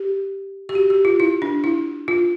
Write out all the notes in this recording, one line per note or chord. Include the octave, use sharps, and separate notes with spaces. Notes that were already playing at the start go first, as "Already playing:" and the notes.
Already playing: G4
G4
F#4
G4
F4
E4
D4
E4
F4